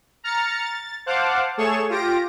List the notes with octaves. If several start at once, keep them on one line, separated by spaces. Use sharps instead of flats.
A#5 F6 A6 C#7
A6
C5 F5 F#5 A5 D6
A3 G#4 A4 C#5 C#6 E7
F4 G4 A#6 D7